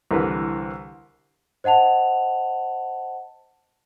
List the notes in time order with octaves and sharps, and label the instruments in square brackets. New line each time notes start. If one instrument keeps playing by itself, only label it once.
[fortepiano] C2 D3 E3 A#4 B4
[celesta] C5 D#5 F#5 A5 F7